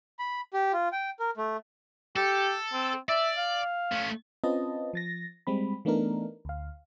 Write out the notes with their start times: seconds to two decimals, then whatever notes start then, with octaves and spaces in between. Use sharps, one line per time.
0.19 B5
0.54 G4
0.73 F4
0.92 G5
1.20 A#4
1.37 A3
2.16 G4 A4
2.73 C4
3.09 D5 E5
3.38 F5
3.92 A3 C#4
4.44 C4 C#4 F4 B4 D#5 A5
4.93 F3 A6 A#6
5.47 G3 G#3 C4 B5
5.85 E3 A3 B3 D4 D#4 A#4
6.45 D2 F5